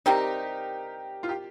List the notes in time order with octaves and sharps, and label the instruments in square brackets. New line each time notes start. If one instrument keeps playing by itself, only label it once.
[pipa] C3 G3 C4 D#4 [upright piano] G4 A#4
[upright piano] F4
G4